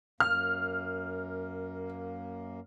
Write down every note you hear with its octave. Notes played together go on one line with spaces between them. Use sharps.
F#2 A#3 F6